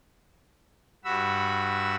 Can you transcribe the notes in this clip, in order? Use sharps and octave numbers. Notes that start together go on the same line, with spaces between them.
G2 F#4 B5 E6